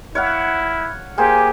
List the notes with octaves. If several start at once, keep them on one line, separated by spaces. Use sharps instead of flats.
E4 C#5 F5 F#5
A#3 G4 G#4 C5 G#5